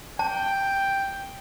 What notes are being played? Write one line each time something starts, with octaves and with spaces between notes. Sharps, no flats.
G5 A5